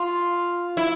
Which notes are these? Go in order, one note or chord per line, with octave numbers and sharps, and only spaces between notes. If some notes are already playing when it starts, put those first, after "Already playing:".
Already playing: F4
E4